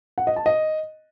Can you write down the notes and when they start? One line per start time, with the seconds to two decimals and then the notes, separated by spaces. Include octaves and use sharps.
0.18 F#5
0.27 D#5
0.36 A5
0.46 D#5